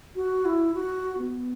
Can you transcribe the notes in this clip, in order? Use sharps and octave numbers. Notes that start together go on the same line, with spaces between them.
F#4
E4
F#4
B3